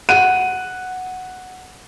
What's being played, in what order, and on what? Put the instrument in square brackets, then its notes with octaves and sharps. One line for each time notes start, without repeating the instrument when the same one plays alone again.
[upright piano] F#5 F#6 D#7